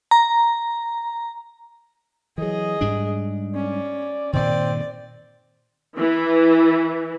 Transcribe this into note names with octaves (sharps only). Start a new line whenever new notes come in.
A#5
E3 F#3 G#4 D#5
G#2 G3 D4
C#4 D5
G2 A#2 D#3 C4 D5
E3